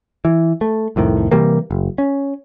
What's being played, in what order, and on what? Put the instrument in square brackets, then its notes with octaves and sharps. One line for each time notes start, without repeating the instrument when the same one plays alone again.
[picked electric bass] E3
A3
C2 F2 A2 D#3
C3 E3 G3 A#3
F#1
C#4